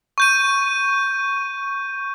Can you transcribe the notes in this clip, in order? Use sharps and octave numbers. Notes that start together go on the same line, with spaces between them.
C#6 G6 D#7